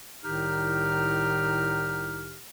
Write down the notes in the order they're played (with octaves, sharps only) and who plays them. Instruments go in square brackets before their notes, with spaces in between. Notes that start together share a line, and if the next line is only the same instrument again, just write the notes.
[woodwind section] C2 A2 D#3 D#4 G4 F6